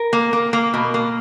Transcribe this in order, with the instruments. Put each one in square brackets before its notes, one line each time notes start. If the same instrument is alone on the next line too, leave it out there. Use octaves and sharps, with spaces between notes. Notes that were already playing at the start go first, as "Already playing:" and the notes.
Already playing: [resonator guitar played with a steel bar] A#4
A#3
A#3
A#3
B2
A#3